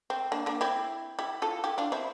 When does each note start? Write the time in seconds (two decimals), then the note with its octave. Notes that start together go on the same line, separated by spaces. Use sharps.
0.10 C4
0.32 A#3 D4
0.46 A#3 D4
0.61 C4 E4
1.19 E4 G4
1.42 F4 A4
1.64 E4 G4
1.78 D4 F4
1.92 C4 E4